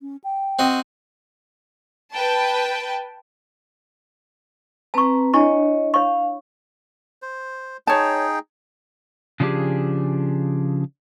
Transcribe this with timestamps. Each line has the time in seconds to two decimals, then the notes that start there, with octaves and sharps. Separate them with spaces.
0.01 C#4
0.24 G5
0.59 C4 F#4 D#5
2.13 B4 G5 A5
4.94 C4 B4 A5 A#5 C#6
5.34 D4 E4 C#5 D#5 C#6
5.94 C#5 F5 C#6
7.22 C5
7.87 D#4 G#4 C#5 G5 A5
9.40 C#3 F3 C#4 D4 G4 G#4